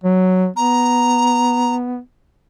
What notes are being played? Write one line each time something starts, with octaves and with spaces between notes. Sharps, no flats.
F#3
B3 A#5